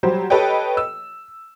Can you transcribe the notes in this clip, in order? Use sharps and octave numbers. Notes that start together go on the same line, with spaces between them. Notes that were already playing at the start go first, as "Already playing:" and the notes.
F#3 G3 G4 C5
G4 A4 B4 C#5 D#5 G5
E6